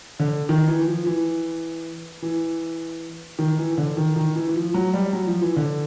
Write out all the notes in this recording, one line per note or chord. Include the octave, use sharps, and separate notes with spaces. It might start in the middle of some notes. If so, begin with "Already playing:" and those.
D3
D#3
E3
F3
E3
E3
D#3
E3
D3
D#3
D#3
E3
E3
F3
F#3
G3
F#3
F3
E3
D3